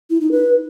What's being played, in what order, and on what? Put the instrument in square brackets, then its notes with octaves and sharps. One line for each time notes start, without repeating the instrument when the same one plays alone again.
[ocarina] E4
D#4
B4